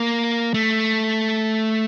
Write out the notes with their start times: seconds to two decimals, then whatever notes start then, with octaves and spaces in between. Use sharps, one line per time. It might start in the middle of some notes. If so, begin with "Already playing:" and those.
Already playing: A#3
0.54 A3